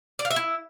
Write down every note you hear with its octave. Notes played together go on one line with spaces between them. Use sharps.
D5
F5
E5
E4